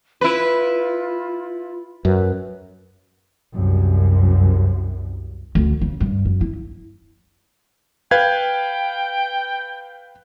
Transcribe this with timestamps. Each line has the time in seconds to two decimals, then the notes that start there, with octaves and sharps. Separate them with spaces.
0.21 E4 F4 B4
2.05 F#2 B4
3.52 C2 F#2
5.55 D2
5.81 C#3
6.00 G2
6.25 F#2
6.41 E4
8.11 B4 F5 G5 G#6